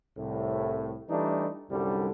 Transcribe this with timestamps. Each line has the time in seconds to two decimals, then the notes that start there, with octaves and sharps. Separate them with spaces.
0.17 C2 A2
1.09 E3 G3 A3 D4 D#4
1.70 C2 F#2 D3 G3